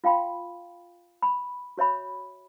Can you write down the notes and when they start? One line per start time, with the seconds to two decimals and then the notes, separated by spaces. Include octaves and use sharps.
0.04 F4 F5 G5 B5 C6
1.22 B5
1.78 F#4 C#5 E5 B5